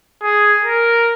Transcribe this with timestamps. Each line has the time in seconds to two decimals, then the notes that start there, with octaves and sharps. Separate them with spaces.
0.23 G#4
0.65 A#4